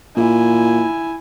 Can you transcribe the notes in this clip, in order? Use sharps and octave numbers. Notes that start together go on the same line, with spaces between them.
A#2 E4 G#5